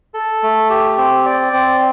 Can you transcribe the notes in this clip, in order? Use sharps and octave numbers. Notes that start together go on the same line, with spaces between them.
A4
A3
G4
C4
D5
C4